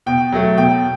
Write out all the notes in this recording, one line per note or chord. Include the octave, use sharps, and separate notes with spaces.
B2 G5
F#3 A3
B2 G5